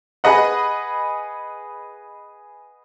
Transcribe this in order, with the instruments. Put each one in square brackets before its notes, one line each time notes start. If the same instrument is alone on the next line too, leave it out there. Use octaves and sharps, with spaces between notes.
[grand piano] G#4 B4 D#5 F#5